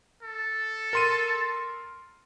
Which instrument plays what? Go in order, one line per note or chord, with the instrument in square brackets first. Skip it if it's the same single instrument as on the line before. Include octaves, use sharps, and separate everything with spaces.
[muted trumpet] A4
[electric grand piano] A#4 C6 D#7